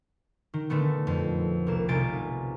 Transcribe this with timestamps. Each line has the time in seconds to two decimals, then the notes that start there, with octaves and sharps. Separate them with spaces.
0.54 D#3
0.70 A#2 D3 A3 B3
1.07 F2
1.67 C2 A#3 E7
1.88 B1 C3 F4 G#5 A6 D7